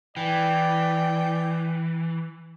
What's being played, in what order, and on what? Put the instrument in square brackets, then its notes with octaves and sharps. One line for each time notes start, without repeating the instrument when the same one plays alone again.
[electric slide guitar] E3 [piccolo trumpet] D5 [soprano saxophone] G5